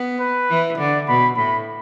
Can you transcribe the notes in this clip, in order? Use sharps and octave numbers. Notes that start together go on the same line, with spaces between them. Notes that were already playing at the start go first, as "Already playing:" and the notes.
Already playing: B3
B4
E3
D3 D5
B2 B5
A2 B5